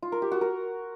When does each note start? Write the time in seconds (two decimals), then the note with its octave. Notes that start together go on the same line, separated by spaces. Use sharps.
0.03 F4
0.12 A#4
0.22 G4
0.32 F#4
0.41 A#4